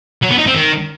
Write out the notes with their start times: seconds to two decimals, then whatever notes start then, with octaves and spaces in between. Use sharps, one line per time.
0.23 F#3
0.31 B3
0.39 D#4
0.47 C4
0.55 D#3